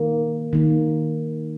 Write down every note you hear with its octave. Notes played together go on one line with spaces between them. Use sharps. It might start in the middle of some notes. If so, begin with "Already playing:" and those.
Already playing: D#3 A#3
D#3 A#3